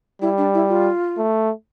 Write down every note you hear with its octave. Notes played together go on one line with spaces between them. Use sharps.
G3 E4
D4
E4
F4
A3